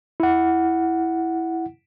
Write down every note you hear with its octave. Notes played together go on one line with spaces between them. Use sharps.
E4 F#5